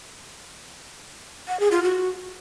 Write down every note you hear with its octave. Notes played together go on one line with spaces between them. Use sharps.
F#5
G#4
F4
F#4